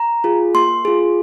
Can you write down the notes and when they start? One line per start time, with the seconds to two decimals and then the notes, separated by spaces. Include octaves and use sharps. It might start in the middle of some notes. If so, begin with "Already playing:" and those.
Already playing: A#5
0.24 F4 G#4
0.54 A#3 C6
0.85 F4 G#4